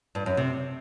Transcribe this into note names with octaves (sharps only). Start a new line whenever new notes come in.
G2
F#2
C3